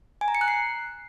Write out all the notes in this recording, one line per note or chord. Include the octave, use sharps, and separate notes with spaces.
G#5
A#5
C#7
F#6
C7